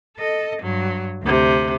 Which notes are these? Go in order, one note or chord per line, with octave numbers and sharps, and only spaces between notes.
A4 D#5
G2 F#3
D2 C3